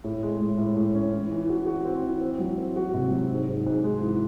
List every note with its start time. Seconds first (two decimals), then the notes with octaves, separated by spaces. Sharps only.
0.04 A2
0.22 G#3
0.41 A2
0.58 A2
0.76 A2
0.94 C#4
1.13 E3
1.31 E3
1.49 F#4
1.66 F#4
1.85 C4
2.03 E3
2.21 C4
2.39 F#3
2.58 C4
2.76 F#4
2.94 C3
3.11 F#3
3.30 G#2
3.48 G#2
3.66 G#2
3.84 G#3
4.01 E3